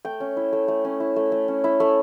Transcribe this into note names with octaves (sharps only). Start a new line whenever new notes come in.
A3 G5
C#4
E4
A3
A3
C#4
E4
A3
A3
C#4
E4
A3